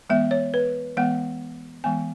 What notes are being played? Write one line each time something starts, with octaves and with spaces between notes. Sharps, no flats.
E3 G#3 B3 E5
C#5
B4
E3 G#3 B3 F#5
E3 G#3 B3 G#5